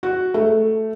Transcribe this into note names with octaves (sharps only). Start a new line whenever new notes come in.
F#4
A3